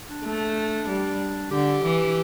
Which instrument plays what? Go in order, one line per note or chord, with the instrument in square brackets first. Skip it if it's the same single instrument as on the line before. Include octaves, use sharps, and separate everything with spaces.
[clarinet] D4
[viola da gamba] A3
G3
[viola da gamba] D3 [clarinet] G4
[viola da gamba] E3